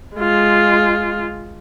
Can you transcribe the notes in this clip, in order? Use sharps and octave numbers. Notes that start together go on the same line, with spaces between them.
G#3 F4